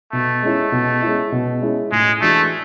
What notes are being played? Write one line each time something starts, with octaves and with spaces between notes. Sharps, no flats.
B2 A3
G#3 C#4 E4
B2
G#3 C#4 E4
B2
G#3 C#4 E4
A2 G#3
E3 G#3 A3 D4 F#4